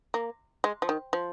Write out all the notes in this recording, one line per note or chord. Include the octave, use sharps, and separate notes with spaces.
A#3
G#3
F3
D#3
F3